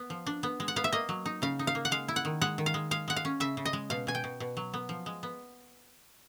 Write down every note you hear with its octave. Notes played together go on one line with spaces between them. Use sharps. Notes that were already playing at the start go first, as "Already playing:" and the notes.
Already playing: B3
F3
D4
B3
G#3
F#5
B3 F5
E5
A#3 D#5
F#3
D#4
C#3 F5
D#4
F5
A#3
F#5
G#3 F5
E4
F#5
D#3
G#3 F#5
D#3
F5
G#3
G#3 F5
G#3 F#5
F5
C#4
C#3 E5
C#3
D#5
G#3
B2 F5
B2 G#5
G5
B2
B2
F#3
B3
F3
G#3
B3